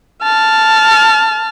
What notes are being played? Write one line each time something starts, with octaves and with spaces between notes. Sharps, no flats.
A5 F6